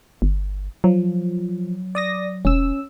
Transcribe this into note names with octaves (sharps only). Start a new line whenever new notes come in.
G1
F3 F#3
D5 D#6 A#6
E1 C#4 E6